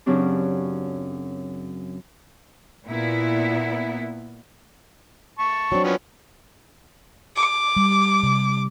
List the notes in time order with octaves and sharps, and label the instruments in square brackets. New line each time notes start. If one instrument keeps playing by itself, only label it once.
[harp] F#2 C#3 F#3 C4 D4 G4
[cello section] A#2 B3 E4
[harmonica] A5 C#6
[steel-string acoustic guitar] F#3 C4 D4
[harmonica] F3 B3 C#4
[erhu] D6
[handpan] G3
C3